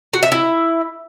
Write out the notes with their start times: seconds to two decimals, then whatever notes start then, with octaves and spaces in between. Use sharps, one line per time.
0.13 F#4
0.23 E5
0.32 E4